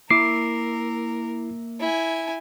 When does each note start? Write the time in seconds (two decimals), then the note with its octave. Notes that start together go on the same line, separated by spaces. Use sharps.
0.10 A#3 E4 A#4 E5 C#6 D6 C7
1.80 E4 G#5